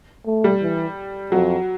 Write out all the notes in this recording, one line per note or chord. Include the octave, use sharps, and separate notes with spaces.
A3
G3
E3
F2 F#3